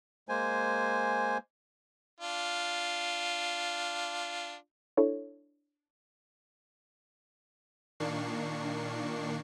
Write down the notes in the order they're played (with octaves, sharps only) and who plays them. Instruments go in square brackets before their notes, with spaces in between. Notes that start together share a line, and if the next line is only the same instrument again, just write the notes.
[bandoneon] G#3 A#3 C5 G#5
[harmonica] D4 F4
[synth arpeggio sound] D4 E4 A4 C#5
[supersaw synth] A#2 D#3 A#3 D4 C#6 C7